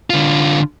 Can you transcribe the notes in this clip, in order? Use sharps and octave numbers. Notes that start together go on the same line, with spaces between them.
D3 F4